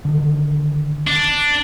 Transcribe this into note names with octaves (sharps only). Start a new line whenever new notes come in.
D3 D#3
D4